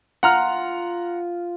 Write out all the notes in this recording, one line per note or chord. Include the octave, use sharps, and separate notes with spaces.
F4 F#5 A#5 F6